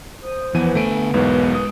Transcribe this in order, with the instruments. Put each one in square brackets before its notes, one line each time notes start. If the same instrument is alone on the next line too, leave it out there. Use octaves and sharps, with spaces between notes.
[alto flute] C5 [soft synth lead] D#6
[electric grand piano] E2 E3 D#7 [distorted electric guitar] F3 [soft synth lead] B3
[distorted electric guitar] D3 G#5 [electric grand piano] A3 D7
[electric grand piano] B1 E2 G#2 [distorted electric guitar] G#3 A#4 [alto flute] B4
[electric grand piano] D#6